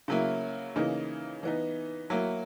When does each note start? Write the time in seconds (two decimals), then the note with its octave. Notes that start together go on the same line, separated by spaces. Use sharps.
0.08 C#3 F#3 A#3 E4
0.76 C#3 E3 A#3 D#4
1.43 E3 B3 D#4
2.10 F#3 A#3 E4